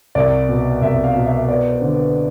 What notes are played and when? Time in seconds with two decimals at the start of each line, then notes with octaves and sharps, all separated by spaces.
0.15 C2 D5
0.49 B2
0.82 C2 E5
1.04 F5
1.16 B2
1.26 E5
1.49 B3 D5
1.71 C5
1.82 D3
1.93 B4